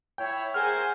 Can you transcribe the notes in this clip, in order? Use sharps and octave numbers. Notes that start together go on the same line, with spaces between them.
E4 C#5 G5
G#4 A#4 C5 F#5 G#5 F6